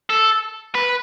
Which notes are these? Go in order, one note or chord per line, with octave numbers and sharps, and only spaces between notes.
A4
B4